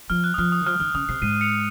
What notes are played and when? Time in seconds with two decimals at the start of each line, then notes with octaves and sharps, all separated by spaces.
0.10 F3 F6
0.24 F#6
0.34 D#6
0.38 F3 F6
0.52 D#6
0.61 D#3
0.66 F3 F6
0.80 D#3 F6
0.94 C#3 D#6
1.09 C3 C7
1.22 G#2 C7 D#7
1.41 C#7 F7